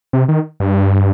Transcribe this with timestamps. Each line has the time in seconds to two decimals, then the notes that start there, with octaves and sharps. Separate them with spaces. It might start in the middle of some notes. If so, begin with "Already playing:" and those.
0.13 C3
0.29 D#3
0.60 G2